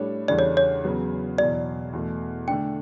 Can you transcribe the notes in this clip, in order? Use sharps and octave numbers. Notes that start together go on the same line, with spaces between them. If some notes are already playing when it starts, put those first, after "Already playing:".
Already playing: A2 G3 D4 A4 C#5
E2 C#3 G3 D4 A4 D5
C#5
C#5
E2 C#3 F#3 B3
E2 B2 F#3 D5
E2 B2 A3
D3 A3 D4 G5